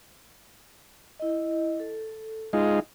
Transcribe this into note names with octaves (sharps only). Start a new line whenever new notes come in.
E4 D#5
A4
G#3 D#4 F4